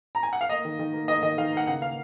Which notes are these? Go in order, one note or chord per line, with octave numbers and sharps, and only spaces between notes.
A#5
G#5
F#5
F5
A#3 D#5
D#3
D#3
A#3
A#3 D#5
D#3 D#5
D#3 F5
A#3 F#5
C#3 F#5
A#3 F5